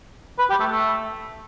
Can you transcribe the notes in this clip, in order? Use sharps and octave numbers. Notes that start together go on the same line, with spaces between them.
B4
G4
A3
A3